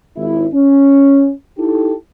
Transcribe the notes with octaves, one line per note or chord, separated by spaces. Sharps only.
G#1 E4
C#4
D#4 E4 G4 A4